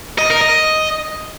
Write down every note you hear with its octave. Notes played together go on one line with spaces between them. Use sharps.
D#5
A#4
D#5